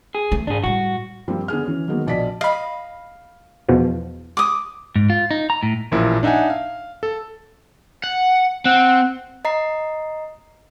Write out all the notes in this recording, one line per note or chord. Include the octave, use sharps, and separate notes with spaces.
G#4
E3 A3
G#2 D4 G#4
A2 G3 F#4
G2 F3 G3 A#3 C4 F4
D3 B3 G#4 F6
E3 C#4
D#3 F#3 G#3 A#3 B3
A#1 B2 D5 D#5 A5 B6
D#5 F5 B5
E2 B2 F3
D6 D#6
G#2
F4
D#4
A#5
A2
A1 A#2 F3 E4 A#4
D4 D#4 E5 F#5 G#5
F5
A4
F#5
C4 F#5
D#5 A#5 C7